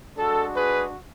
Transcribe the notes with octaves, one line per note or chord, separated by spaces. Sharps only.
G#3 D4 F#4 A4
G#4 B4